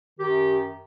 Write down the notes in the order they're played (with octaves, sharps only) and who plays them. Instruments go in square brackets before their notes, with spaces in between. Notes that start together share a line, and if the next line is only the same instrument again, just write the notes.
[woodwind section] F#2 D#3 G4